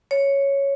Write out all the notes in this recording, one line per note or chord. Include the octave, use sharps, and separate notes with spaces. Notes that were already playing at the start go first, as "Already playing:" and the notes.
C#5